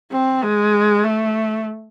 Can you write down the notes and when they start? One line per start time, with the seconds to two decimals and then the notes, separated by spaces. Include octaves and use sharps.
0.12 C4
0.43 G#3
1.04 A3